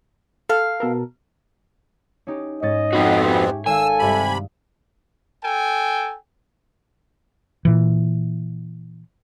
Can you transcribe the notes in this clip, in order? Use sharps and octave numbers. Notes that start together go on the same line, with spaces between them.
A4 F5
B2 A4 A#4
C#4 D#4 G4
G#2 C#4 D#5 A6
F2 F3 B3 C4 D#4 F#4
G4 E5 G#5 C#6
G#1 A4 F5 G#5 E6
G2 C3 B5 E7
A4 G5 G#5
A#2 E3